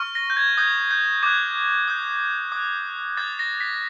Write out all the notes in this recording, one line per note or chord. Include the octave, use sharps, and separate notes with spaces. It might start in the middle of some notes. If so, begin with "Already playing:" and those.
Already playing: C#6 F6
A#6
G6
G#6
D#6 G6 G#6
G6
D6 F#6 G#6
D#6 G6
D#6 F#6
D#6 G6 A6
A#6
B6